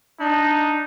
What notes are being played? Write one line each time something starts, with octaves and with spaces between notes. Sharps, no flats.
D4 D#4